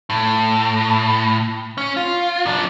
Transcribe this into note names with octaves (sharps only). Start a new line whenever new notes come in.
A2
C#4
F4
F#2 D4